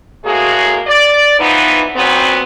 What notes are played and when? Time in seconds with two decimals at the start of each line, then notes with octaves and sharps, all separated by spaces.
0.25 A2 G#3 A#3 F#4 G#4
0.87 D5
1.40 E3 F3 B3 D#4
1.96 A#2 C#3 F#3 B3 C4